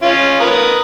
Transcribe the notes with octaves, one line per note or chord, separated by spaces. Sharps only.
C#4 F4
A#4 B4 D#6